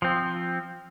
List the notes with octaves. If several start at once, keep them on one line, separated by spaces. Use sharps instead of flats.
F3 C4